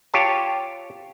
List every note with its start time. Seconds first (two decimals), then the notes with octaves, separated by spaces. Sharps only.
0.14 F4 G4 C#5 A5